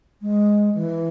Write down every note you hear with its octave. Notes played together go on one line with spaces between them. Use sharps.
G#3
E3